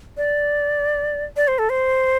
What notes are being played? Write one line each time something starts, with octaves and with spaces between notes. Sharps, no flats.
D5
D5
C5
A4
C5